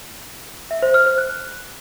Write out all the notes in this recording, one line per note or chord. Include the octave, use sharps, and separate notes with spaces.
E5
C5
F6
C5
F#6